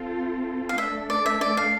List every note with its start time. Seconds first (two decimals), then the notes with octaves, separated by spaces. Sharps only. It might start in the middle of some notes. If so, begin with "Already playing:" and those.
Already playing: C4 F4 A4
0.69 F5
0.78 A3 D4 A4 E5
1.10 D5
1.26 E5
1.41 D5
1.57 F5